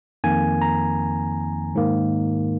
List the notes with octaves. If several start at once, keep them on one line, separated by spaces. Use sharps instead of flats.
F2 D#3 A#3 G#5
A#5
G#2 D#3 A#3